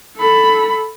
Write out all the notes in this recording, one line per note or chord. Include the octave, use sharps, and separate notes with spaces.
A4 B5